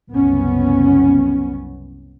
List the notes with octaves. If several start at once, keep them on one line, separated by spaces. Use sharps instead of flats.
F#1 C2 B3 C#4